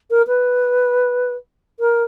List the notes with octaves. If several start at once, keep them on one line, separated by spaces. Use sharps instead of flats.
A#4
B4
A#4